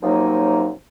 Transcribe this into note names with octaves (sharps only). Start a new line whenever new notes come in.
F#2 C3 F3 F#3 A#3 D#4